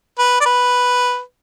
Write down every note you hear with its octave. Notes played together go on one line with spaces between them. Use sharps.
B4
D5
B4